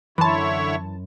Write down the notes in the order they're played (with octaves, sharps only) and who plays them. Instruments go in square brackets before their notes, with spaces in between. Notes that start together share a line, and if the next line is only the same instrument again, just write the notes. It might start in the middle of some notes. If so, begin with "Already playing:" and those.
[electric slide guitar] F#2 [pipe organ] D3 E4 C#5 [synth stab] E3 A5 [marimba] B5 C6